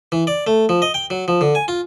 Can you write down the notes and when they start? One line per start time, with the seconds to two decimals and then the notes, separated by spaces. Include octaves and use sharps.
0.12 E3
0.27 D5
0.47 A3
0.69 F3
0.82 D#5
0.94 G5
1.10 F#3
1.28 F3
1.41 D3
1.55 G#5
1.68 F4